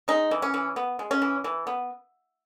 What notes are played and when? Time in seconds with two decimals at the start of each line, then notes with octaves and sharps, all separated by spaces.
0.08 G#3 D#4
0.31 E3
0.42 C#4
0.54 E3
0.76 B3
0.99 G#3
1.11 C#4
1.22 E3
1.44 E3
1.67 B3